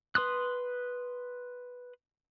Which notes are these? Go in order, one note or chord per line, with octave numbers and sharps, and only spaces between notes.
B4 C6 D#6 F#6